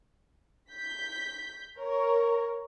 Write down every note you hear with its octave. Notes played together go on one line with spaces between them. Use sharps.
G6 B6
A#4 C#5